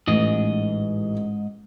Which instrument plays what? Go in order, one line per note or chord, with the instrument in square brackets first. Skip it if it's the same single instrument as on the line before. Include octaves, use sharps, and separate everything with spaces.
[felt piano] A1 [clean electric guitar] G#2 D#5